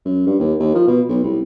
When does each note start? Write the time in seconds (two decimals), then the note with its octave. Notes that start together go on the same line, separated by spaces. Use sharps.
0.05 F#2
0.26 G2
0.40 D#2
0.60 D#2
0.75 F3
0.87 B2
1.09 B1
1.24 C2